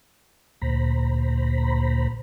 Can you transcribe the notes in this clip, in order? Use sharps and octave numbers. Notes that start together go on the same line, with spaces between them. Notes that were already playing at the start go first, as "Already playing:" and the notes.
D2 A#2 C5 A#5 B5